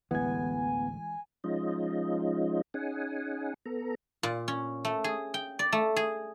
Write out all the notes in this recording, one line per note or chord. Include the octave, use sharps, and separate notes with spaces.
A1 D2 E3 G#3 B3 G#5 G#6
F3 G#3 C#4 D#4 F4 D#5
C#4 D#4 G#4 F#5 G#5
B3 A4 A#5
A#2
C#4
A3
G#4
G5
D5
A3
G#4